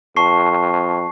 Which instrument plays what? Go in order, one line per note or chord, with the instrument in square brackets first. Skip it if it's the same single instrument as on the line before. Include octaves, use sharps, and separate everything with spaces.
[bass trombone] F2 [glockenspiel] A5 C#6 C7